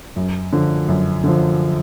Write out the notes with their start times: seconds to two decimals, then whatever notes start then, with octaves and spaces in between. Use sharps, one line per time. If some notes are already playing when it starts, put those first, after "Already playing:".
0.16 F#2
0.53 D3 F3
0.88 F#2
1.24 D3 F3